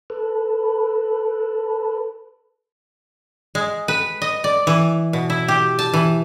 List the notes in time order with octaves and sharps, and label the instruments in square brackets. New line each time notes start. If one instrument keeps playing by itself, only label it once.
[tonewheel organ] A4 B4
[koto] G#3
B4
D#5
D5
E3
B2
E4
G4
A5
E3